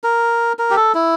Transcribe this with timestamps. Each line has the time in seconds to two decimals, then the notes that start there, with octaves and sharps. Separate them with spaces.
0.04 A#4
0.59 A#4
0.71 G4
0.76 A4
0.94 E4